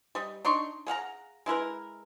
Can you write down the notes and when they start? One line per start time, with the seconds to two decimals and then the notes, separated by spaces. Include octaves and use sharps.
0.15 G3 D#5
0.45 D4 D#4 C6 C#6
0.87 G#4 F5 F#5 A#5
1.46 G#3 E4 A#4 B4